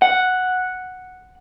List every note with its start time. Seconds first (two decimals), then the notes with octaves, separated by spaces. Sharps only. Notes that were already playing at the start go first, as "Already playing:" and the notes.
0.02 F#5